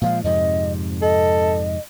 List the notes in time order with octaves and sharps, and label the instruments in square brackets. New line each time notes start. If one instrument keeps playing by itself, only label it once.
[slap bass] A#2 F3 G#3 [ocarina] F5
[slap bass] F2 G#2 C3 [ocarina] D#5
[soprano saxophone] A4 [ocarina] D#5